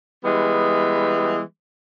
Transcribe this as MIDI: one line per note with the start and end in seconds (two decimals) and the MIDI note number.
0.24 1.41 52
0.24 1.41 55
0.24 1.41 56
0.24 1.41 59